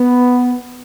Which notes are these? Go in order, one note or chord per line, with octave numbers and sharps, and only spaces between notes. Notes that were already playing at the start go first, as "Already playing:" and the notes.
Already playing: B3